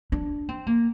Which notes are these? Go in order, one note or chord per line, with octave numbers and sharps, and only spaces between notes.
D4
C4
A#3